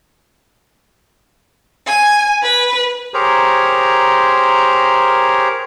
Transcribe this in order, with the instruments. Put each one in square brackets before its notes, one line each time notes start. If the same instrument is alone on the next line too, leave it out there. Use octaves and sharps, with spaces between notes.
[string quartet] G#5
B4
[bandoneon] G4 G#4 A#4 C5 C#5 A#5